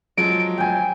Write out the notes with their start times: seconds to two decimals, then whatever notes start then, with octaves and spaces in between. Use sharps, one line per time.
0.17 F3 F#3 G#3 D7
0.58 G5 G#5